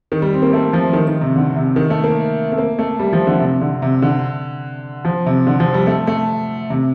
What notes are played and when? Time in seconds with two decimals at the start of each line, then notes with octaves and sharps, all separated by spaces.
0.12 D#3
0.22 G3
0.33 C4
0.42 A#3
0.53 A3
0.73 F3
0.93 D#3
1.08 D#3
1.21 C3
1.36 D3
1.56 C3
1.76 D#3
1.90 A3
2.04 A#3
2.52 A3
2.58 A#3
2.79 A3
2.99 G3
3.13 F3
3.27 D3
3.40 C3
3.61 D3
3.82 C3
4.02 D3
5.05 F3
5.26 C3
5.47 D3
5.60 F3
5.74 G3
5.87 A3
6.07 A3
6.70 C3